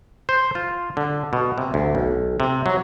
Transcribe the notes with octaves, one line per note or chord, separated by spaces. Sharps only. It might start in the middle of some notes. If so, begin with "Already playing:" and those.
C5
F4
D3
B2
C3
D2
B1
C3
F#3